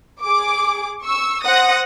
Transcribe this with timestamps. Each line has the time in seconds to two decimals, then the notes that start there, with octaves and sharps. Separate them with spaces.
0.22 G#4 D6
1.02 C#6 E6
1.43 C5 F#5 D#6 A#6